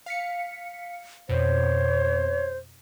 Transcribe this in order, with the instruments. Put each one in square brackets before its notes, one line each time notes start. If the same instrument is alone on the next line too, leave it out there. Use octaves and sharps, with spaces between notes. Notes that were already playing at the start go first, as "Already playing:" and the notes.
[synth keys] F5 B6 C#7
[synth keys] F2 B2 [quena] C5 [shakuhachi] C#5